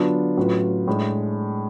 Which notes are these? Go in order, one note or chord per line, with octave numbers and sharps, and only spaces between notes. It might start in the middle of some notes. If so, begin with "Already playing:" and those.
Already playing: D3 F#3 B3 D4 F4
A2 F#3 C#4 F4 B4
A2 G#3 D4